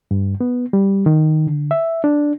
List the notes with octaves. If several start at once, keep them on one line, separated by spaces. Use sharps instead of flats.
G2
B3
G3
D#3
D3
E5
D4